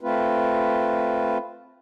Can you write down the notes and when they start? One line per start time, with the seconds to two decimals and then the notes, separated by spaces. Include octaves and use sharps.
0.01 A3 C4 F4 B4